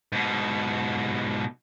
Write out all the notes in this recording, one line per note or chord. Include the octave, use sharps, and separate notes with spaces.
G#2 B2